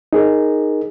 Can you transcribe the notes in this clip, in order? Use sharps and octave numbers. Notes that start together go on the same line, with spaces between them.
D#4 G#4 A#4